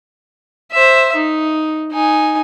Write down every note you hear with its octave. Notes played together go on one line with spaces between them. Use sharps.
C5 E5
D#4
D#4 G#5